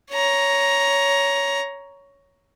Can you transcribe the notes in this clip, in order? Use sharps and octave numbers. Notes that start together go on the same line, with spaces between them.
C#5 A#5